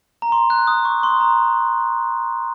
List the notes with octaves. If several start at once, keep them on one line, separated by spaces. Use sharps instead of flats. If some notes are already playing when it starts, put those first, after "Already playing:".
A#5
C6
F#6
D#6
C#6
C6
A#5